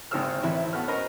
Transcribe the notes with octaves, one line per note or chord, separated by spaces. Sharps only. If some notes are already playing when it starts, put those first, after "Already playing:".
G#1 D#2 C#3 C5 E6 F6
A1 C4 E4 E5
B3 F#4 A4 B4 F6
C#4 A#4 C5 D#5 B5